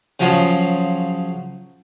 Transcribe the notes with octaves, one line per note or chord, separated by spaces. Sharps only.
C#3 F3 F#3 F4